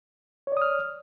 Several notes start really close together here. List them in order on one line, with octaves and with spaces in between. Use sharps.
C#5 D5 D#6 F6